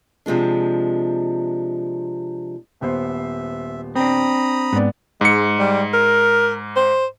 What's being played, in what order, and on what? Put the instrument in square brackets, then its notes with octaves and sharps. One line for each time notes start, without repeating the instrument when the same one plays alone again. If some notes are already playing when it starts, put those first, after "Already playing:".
[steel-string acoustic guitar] C3 F3 G#3 D4
[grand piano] D#1 B3 C5 [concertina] E5
[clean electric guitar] C4 D4 [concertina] A#5 B5 D#6
[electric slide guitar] G#2 [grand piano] B3 D5
[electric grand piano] G#2 C#7 [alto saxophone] G#3
[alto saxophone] G3
A#4
C5